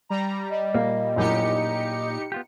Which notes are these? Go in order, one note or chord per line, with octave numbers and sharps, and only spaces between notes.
G3 A#5
G3 D#5
A#2 A#3
A#1 F#2 A2 D#4 G4 C#7
B3 F4 G4